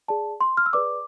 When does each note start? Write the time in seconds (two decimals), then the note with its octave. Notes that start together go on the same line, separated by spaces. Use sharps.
0.08 G#4 D5 A5
0.41 C6
0.57 F6
0.66 E6
0.73 G#4 B4 D5 D6